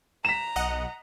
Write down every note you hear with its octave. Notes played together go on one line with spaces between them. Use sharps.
A#5 B6 E7
B1 D#5 F#5